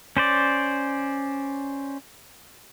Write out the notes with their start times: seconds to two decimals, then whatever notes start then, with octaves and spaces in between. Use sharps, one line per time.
0.17 C#4 C5 D5